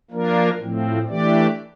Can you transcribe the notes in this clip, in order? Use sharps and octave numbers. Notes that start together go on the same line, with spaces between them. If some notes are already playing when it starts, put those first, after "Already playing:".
F3 A#3 D4 F4 A#4
A2 F3 C4
E3 A3 D4 G4 D5